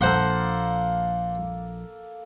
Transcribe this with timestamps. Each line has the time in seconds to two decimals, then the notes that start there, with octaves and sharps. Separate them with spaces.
0.01 A#1 A#3 A4 C5 F#5 C6